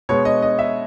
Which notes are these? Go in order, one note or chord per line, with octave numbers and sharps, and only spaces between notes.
B2 G#3 B3 C#5
D#5
D#5
E5